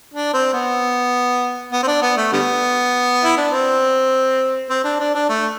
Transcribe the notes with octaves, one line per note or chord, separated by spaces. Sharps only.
D4
C4
B3
B3
C4
D4
B3
A3
D3 G3 B3
E4
D4
C4
C4
D4
D4
D4
A3